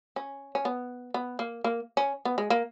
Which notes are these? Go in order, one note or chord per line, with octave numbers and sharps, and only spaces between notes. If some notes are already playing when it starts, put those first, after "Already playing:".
C#4
C#4
B3
B3
A#3
A#3
C#4
B3
G#3
A#3